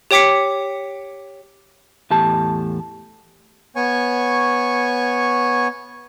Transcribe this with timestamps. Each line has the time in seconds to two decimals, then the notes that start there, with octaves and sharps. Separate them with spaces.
0.11 G4 C#5 G5 D6 B6 C#7
2.10 E2 A2 G4 A5
3.76 B3 C#5 G#5 C#6